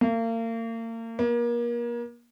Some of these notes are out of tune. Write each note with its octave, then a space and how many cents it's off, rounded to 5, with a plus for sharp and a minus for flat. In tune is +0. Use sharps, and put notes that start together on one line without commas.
A#3 -35
A#3 +35